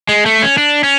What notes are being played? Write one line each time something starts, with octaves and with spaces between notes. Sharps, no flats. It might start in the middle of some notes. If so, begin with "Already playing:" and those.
G#3
A3
C#4
D4
C#4